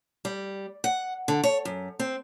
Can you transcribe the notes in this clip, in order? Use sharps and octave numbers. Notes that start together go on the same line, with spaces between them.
G3
F#5
D3
C#5
F#2
C4